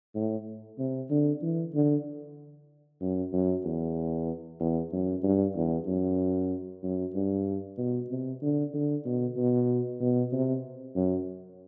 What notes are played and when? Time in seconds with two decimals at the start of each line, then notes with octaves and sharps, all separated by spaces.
0.15 A2
0.79 C3
1.10 D3
1.42 E3
1.75 D3
3.02 F#2
3.33 F#2
3.65 E2
4.60 E2
4.93 F#2
5.24 G2
5.56 E2
5.87 F#2
6.83 F#2
7.15 G2
7.78 B2
8.10 C3
8.42 D3
8.74 D3
9.05 B2
9.37 B2
10.01 B2
10.32 C3
10.96 F#2